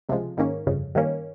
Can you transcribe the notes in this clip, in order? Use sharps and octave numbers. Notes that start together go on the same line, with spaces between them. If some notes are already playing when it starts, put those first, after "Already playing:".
C#2 C3 F3 G#3
G#2 D#3 A#3 C#4
G1 F2 C#3
G2 D#3 A#3 C#4